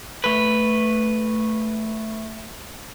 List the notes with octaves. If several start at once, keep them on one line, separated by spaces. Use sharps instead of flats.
A3 B4